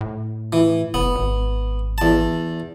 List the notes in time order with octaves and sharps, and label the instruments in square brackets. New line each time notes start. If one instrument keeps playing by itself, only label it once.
[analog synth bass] A2
[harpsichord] E3
[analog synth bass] F#1 [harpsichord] B3
[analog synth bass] G#1
[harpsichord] E2 A5